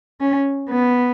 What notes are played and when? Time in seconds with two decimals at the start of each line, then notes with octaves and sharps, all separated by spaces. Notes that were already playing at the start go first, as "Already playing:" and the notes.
0.21 C#4
0.69 B3